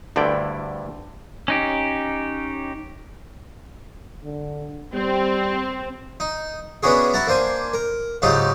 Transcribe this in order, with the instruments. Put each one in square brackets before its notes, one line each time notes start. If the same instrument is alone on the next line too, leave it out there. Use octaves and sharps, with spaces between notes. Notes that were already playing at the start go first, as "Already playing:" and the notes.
[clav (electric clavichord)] D2 G2 D3 E4 D5 G5
[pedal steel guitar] C#4 D#4 G4
[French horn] D3
[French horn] G3 [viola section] C4
[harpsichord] D#4
B3 C#4 D4 E4 F#4 G#4
E4 F#4 A5 A#5
A#3 D4 C5 G#5
A#4
G#2 C#3 F#3 D#4 F4 G4